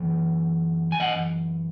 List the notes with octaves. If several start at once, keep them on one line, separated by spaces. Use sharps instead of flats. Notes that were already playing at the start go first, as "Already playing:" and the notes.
Already playing: F#2 E3
G#5
D#5 F#5